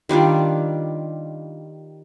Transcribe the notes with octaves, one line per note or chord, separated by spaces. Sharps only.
D#3 G3 D4 F4